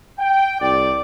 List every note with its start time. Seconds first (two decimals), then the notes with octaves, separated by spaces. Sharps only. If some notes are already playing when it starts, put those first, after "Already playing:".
0.19 G5
0.61 C2 D5